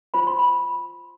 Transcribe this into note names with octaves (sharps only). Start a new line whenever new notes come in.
F4 C5 B5
C6
B5